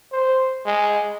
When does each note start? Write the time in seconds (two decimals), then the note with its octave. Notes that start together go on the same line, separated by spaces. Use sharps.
0.13 C5
0.66 G#3